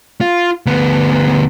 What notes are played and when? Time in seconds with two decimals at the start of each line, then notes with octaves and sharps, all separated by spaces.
0.21 F4
0.66 D2 B3